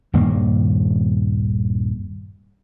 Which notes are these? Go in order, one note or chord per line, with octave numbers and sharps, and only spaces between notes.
D#1 G2 D#3 A#3